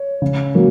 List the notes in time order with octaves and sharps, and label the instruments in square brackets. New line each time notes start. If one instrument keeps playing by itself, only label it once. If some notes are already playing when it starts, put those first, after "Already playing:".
Already playing: [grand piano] C#5
C#3
F#3 A#3